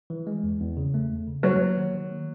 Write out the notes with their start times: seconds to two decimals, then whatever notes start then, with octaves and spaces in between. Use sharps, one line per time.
0.10 E3
0.27 G#3
0.43 E2
0.60 E2
0.77 C#3
0.94 A3
1.11 E2
1.27 C#3
1.43 F#3 A#3
1.60 A#3
1.77 D#3
1.94 D#3
2.11 A#3